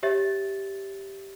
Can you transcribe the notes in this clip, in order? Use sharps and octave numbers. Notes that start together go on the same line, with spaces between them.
G4 C#5 E5 A6